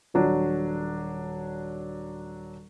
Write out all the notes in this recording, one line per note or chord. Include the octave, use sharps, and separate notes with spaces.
D#1 F#3 D4